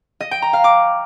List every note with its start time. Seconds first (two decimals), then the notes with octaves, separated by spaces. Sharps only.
0.20 D#5
0.31 G5
0.42 A#5
0.53 F5
0.64 D6